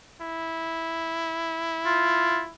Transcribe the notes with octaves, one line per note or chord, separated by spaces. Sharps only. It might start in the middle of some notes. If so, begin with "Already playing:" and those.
E4
F4